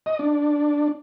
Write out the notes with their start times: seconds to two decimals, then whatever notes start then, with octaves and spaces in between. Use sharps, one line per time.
0.06 D#5
0.19 D4